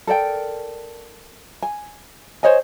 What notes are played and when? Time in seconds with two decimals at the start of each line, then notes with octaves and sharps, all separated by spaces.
0.07 A4 A#4 D5 G5
1.62 G#5
2.43 C5 C#5 D#5 G#5